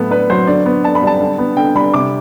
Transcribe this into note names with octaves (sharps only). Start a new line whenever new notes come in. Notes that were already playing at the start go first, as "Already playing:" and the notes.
Already playing: A2 F#3 B3 A4
D4 B4
F#3 C5
D3 D5
B3
D4 A5
B5
G3
A5
D3
B3
D3 G5
G3 B5
C3 D6